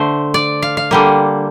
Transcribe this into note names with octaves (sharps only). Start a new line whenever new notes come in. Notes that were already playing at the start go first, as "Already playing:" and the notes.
Already playing: D3 A3 C5
D5
F5
F5
D3 G3 A#3